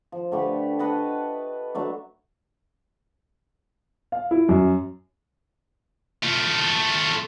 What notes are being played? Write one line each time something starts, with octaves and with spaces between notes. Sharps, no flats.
F3
D3 A3 G4 B4
B4 D#5 F#5 A5
F#3 A3 D4
F5
E4
F#2
A3 F4